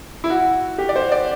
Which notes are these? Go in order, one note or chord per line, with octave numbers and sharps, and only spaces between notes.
E4
F#4
G4
D5
C5
D5